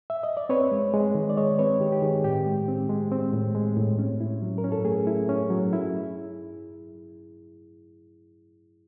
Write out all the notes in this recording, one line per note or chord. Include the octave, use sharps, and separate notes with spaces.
E5
D#5
D5
C4 B4 C#5
G#3
G#3
D#3
D5
G#3 C#5 D#5
C4 B4 C#5
D#3 G4
G4
D#3 G#4
A2 G4
G#3
C4
G#3
C4
A2
G#3
A2
C#4
E4
F#3
A#4
C#4
A4
A3 G#4
E4
C#4
F#3
E4